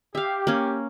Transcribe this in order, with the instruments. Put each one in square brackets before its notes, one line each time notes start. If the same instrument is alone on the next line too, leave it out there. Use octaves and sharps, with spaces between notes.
[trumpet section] G4 [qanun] E5 F5
[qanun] A#3 C#4